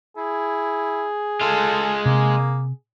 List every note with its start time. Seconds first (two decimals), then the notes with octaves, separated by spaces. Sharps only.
0.17 E4 G#4
1.41 G#3 F4 A4
2.06 C3 A#3